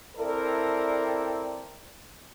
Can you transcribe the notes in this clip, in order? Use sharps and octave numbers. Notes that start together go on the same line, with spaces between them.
C4 E4 A4 A#4 D5